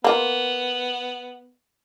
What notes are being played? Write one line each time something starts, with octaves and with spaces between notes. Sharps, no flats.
A#3 B3 F4